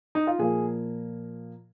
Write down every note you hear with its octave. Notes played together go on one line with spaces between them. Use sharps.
D#4
F4
A#2 F3 A#3 G#4